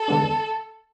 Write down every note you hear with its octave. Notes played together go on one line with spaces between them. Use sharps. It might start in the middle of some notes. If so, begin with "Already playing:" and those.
Already playing: A4
D3 G#3 B3 D4
E2